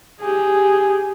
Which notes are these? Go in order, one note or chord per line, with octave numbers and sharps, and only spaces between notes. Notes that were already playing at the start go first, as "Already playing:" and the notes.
G4 G#4